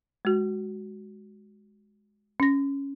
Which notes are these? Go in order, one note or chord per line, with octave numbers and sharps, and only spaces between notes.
G#3 F#4
C#4 A#6